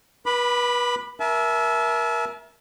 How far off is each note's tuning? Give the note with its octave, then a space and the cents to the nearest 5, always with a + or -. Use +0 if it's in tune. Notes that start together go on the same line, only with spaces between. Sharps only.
B4 -30 B5 +0 D6 +30
A#4 +25 E5 +0 A5 -40